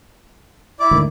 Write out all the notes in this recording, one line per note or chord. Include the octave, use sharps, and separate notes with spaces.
E4 D5 D6
D2 G#2 D#3